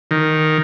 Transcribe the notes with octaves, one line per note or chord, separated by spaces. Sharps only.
D#3